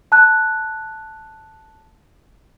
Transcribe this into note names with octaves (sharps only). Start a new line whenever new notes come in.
A5 F#6